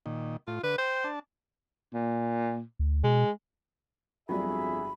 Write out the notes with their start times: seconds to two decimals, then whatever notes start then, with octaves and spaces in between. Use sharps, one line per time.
0.06 A#2 D#3
0.47 A2 F4
0.63 D3 B4
0.78 C5 G5
1.04 D4 A5
1.94 A#2
2.79 D2
3.04 B2 G#3
4.29 G1 F2 F#3 G3 G#4 E5 B5